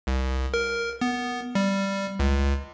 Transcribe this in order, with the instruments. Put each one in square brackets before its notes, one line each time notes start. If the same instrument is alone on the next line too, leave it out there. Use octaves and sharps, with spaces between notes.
[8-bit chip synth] C2
A#4
B3
G3
C#2